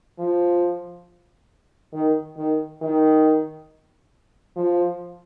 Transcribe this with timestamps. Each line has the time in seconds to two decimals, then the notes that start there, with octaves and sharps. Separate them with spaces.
0.19 F3
1.93 D#3
2.37 D#3
2.82 D#3
4.56 F3